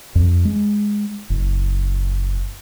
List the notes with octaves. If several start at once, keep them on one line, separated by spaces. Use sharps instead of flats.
F2
G#3
F#1